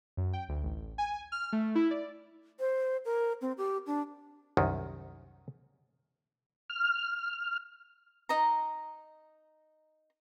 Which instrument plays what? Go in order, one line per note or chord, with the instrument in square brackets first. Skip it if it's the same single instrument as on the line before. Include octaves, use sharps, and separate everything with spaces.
[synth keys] F#2
G5
D2
A1
G#5
F6
A3
E4
D5
[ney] C5
A#4
C4
G4
D4
[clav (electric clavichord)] C2 F#2 D#3
[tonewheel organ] F6
[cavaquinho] D#4 D#5 A#5